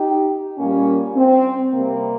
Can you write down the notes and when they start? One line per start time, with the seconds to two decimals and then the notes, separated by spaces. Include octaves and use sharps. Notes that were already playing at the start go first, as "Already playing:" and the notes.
Already playing: D#4 G4
0.58 A#2 G3 A#3 C#4
1.16 C4
1.73 C3 G3 A#3